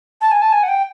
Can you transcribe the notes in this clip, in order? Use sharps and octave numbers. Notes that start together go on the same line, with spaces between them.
A5
G#5
A5
G#5
F#5
G5